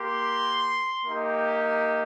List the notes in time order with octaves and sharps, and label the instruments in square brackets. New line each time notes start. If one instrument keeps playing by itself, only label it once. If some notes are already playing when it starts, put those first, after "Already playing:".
Already playing: [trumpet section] A#3 G4 C6
A#3 D#4 G4